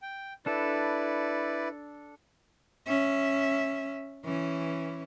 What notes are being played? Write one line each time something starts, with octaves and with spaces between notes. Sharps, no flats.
G5
D4 E4 A4 B4 D5
C#4 E5
E3 C#4